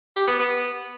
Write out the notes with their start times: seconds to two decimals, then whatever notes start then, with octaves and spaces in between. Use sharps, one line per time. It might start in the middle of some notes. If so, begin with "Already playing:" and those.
0.16 G4
0.28 B3
0.39 B3